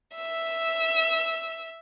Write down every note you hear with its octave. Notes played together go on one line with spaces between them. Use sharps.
E5 E6